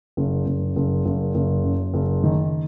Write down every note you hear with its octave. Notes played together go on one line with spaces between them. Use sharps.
F#1
F#1
F#1
F#1
F#1
F#2
F#1
D#3